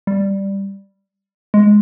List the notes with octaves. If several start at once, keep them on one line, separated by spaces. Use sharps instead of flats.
G3
G#3